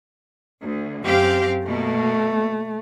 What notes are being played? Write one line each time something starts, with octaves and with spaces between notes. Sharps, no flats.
D2
F#2 C4 G4 F5
B2 A3 A#3